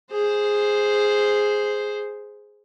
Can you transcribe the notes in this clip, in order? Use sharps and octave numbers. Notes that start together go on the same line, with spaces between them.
G#4 C5